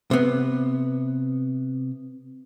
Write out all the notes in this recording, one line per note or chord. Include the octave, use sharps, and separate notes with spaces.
C3 B3